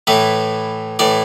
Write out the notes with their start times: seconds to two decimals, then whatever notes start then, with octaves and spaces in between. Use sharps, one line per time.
0.07 A2 E3 B4
0.99 A2 E3 D5